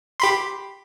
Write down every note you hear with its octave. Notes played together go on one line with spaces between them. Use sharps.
G4 B5 C6